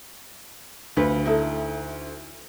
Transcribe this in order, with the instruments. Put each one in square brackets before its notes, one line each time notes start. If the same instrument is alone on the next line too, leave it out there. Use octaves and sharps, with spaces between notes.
[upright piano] D2 [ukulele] F4 B4
[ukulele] D#4 E4 A4